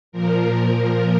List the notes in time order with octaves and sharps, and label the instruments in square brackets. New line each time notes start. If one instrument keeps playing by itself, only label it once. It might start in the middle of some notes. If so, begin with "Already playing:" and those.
[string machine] A#2 F3 A#4